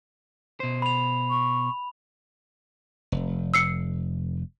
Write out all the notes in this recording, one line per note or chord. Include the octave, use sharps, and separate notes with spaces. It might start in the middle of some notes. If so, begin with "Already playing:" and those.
B2 C5
B5 F7
C#6
F1
E6 C7 C#7